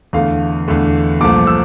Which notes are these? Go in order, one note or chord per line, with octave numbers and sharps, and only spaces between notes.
E2 D3 A3 F5
E2 D3 A3
C2 A#2 F3 A3 D6
E6